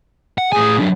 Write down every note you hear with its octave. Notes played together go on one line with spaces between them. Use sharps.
F#5
A2 G#4 G#5
F#2 F#3 D4